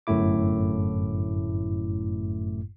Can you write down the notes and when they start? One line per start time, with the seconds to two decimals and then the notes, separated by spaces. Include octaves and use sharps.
0.07 G1 F#2 A2 A3 E4 D6